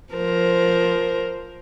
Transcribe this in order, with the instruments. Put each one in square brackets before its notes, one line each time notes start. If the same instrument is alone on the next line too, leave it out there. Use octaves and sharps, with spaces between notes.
[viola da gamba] F3 A#4 C5